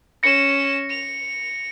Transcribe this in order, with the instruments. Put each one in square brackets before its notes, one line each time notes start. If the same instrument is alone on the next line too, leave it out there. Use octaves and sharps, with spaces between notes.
[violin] C#4 E7 [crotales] A#6 C#7
[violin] F7